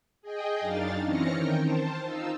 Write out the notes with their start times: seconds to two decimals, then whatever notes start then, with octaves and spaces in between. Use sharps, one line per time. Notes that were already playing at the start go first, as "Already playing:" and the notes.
0.22 G#4 D#5 G5
0.60 F#2 D4 D#4 F5 A6
1.04 E3 C4 C#4 F6 A#6 C#7
1.33 D#3 A#4 G5
1.62 C5 A5
2.04 D#4 F4 E6